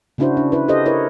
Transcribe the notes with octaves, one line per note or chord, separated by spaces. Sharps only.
C#3 C#4 D4 E4 F#4 C5
D4
E4 B4
E4 G4 A4 C5 D#5
E4 A#4 B4 C#5